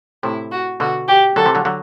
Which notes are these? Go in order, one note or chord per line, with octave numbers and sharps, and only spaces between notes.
A2 C3 E4
F#4
B2 D3 F#4
G4
D3 F#3 A4
C3 E3
D3 F#3
D3 F#3